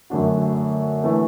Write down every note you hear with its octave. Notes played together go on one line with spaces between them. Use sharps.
F#2 D3 A3 D4 F#4
E3 A3 E4